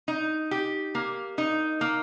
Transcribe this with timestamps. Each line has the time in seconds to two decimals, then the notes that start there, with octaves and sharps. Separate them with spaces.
0.08 D#4
0.51 G4
0.95 A#3
1.38 D#4
1.81 A#3